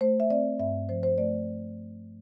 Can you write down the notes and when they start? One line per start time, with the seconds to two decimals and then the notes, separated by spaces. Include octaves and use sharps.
0.01 A3 C5
0.20 E5
0.30 C4 D5
0.59 G2 E5
0.89 F3 C5
1.03 C5
1.18 A3 D5